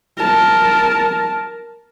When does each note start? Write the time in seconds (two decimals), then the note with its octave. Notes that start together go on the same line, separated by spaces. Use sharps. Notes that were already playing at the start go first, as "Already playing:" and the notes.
0.17 A#4 A5